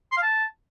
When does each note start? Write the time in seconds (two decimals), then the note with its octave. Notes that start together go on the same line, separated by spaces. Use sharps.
0.12 C6
0.17 F5
0.23 A5